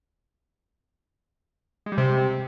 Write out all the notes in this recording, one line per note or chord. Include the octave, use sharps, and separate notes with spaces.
G#3
G3
C3